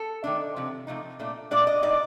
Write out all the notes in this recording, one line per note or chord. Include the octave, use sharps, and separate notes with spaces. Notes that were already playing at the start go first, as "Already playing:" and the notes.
Already playing: A4
D#3 A3 D4
C3 F3
C3 F3 A3 D#4
A#2 A3 D4
A#2 A3 D4 D5
D#5
A2 A3 D#4 D5